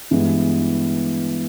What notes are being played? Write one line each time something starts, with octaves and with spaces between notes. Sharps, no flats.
G2 E3 G#3 B3